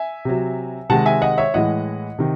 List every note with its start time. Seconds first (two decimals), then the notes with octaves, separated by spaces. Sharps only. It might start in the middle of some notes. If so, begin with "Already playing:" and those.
Already playing: E5 G#5
0.25 C3 F#3
0.90 C3 D#3 G#3 F#5 A5
1.06 E5 G#5
1.22 D#5 F#5
1.38 C#5 E5
1.54 A2 E3 G#3 D#5 F#5
2.19 C3 D#3